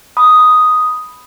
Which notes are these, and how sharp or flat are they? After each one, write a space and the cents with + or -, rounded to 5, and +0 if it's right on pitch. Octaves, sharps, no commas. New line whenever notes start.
B5 +0 D#6 +0